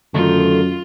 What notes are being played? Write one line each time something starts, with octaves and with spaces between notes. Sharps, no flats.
F#2 D3 D#3 A3 F4